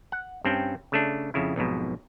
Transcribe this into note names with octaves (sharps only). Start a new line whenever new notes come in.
F#5
G2 C4 C#4 G5
C#3 A3 D4
F2 C#3 E4
B1 F2 G#2 B2